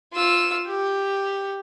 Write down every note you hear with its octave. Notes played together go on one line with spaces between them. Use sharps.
F4 E6
G4